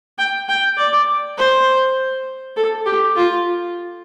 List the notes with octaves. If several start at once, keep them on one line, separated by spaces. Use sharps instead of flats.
G5
G5
D5
C5
A4
G4
F4